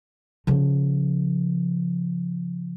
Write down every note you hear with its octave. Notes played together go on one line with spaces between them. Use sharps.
C#3 F3